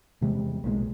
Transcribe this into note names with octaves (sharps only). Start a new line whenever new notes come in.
E2 C3 G3 G#3
B1 A#2 C#3 G#3